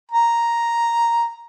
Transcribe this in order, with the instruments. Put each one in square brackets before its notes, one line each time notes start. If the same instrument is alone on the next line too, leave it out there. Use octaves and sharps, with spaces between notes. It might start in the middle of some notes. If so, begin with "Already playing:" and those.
[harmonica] A#5